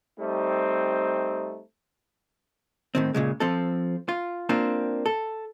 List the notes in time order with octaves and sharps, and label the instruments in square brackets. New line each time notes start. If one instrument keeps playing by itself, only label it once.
[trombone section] G3 A3 C4 D#4
[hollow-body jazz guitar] A2 D#3 C4
A#2 C#3 G#3
F3 C4 A4
F4
A#3 C4 D4 F4
A4